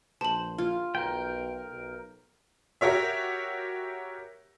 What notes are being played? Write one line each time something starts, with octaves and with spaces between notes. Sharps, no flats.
A#1 C5 A5 F#7
F4
B1 A#4 G5
B1
F#4 G4 A#4 C#5 E5